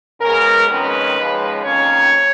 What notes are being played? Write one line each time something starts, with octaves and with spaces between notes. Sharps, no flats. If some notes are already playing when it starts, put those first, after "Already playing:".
C#3 G#3 B3 A#4
F2 D#3 G#3 C#4 B4
D#2 C#3 F3 G#3
F2 D#3 A#3 C#4 C#5